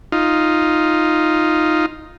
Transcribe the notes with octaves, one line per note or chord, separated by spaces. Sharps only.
D#4 F4